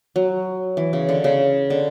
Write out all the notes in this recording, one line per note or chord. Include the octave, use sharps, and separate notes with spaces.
F#3
E3
C#3
D3
C#3
D3